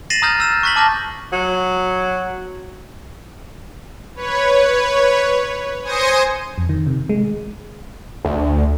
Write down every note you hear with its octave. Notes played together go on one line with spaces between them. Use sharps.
A6 A#6 C7 D#7 E7 F#7
A#5 D#6 F6 G6 A6
E6 F6 G6 A6 E7
C#6 F#6 A6 B6 F#7
A5 D6 F6 G6 A#6
F#3
B4 C#5
C5 G#5 D#6 A#6 C#7 D#7
F2
D#3
C3
G#3
D2